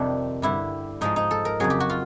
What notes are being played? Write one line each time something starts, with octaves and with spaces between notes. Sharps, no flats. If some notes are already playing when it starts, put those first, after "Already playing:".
Already playing: F2 C3 D#3 G3 D4
G2 D3 G3 E4
G#2 F3 G#3 D#4
D#4
A4
A#4
F2 C#3 F#3 G#4
G4
F#4
F4